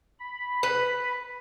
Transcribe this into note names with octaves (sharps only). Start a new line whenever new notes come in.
B5
B4